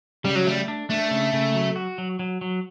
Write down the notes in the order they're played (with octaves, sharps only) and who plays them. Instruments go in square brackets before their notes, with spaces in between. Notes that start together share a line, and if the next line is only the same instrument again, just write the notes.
[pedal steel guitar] C#3 [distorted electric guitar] G3
[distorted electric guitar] F#3
[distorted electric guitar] G3 [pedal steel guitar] A3
[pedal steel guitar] D4
[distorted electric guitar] A3 [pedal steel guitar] D4
[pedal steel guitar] C#3
C#3
F#3
F#4
F#3
F#3
F#3